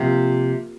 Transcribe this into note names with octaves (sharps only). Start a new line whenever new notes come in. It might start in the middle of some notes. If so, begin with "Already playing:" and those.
Already playing: C3 F3 A#3